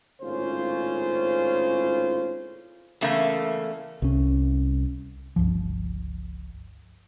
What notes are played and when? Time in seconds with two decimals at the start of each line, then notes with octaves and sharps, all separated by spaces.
0.21 G#1 A2 C#3 C#4 F4 C5
3.01 E2 C#3 A3 A#3
4.02 C2 C#4
5.36 G1 C#2 F3